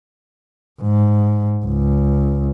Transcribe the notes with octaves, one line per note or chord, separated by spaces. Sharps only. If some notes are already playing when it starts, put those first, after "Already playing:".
G#2
C#2